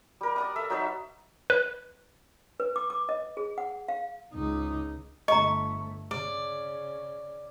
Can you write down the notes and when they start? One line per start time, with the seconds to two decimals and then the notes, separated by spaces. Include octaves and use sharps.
0.21 G3 A#4
0.36 D5 F#5 D#6
0.56 A4 E5
0.70 F#3 D#4 B4 E5
1.50 B4
2.60 B4
2.76 D6
2.90 D6
3.09 D#5
3.37 G#4
3.58 F#5
3.88 F5
4.34 C#2 D#4
5.28 G1 A3 D#5 A#5 C#6
6.11 C#3 D5